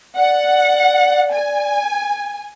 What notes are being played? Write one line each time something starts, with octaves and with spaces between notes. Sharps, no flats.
D5 F#5
G#5